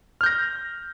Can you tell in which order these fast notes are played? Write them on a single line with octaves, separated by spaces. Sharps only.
F6 G6 A#6